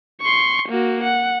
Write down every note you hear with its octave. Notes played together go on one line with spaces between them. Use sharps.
C6 C#6
A#3 F#4
F#5